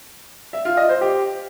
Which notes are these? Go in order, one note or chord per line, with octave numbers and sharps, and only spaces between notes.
E5
F4
D#5
C5
G4